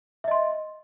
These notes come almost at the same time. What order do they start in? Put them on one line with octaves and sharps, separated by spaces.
E5 D#5 C6